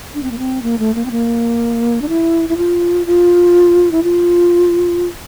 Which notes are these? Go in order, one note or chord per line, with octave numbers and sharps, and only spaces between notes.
D4
C4
A#3
C4
A#3
A3
A#3
C4
A#3
D4
E4
E4
F4
F4
E4
F4